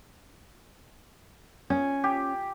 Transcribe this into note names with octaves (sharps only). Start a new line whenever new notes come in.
C#4 G#5
G4